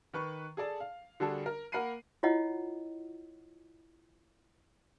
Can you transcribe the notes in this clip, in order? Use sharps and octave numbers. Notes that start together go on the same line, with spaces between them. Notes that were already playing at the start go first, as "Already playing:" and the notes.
D#3 B4 C#6
G#4 A4 D5 A5
F5
D3 G3 D4 F#4 G#4 A4
A#4
A#3 A#4 F#5 B5 C7 D#7
E4 F4 C#5 D#5 F#5